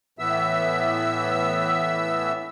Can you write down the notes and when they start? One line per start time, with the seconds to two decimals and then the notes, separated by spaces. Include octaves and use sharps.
0.19 A2 E3 B3 E5 E6